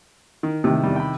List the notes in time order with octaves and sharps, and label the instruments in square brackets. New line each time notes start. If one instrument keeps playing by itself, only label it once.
[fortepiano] D#3
[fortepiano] A2 [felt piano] C3 D#3
[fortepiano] E2 G3
G5 B5